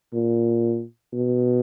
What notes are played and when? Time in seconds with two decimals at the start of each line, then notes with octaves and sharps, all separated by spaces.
0.13 A#2
1.13 B2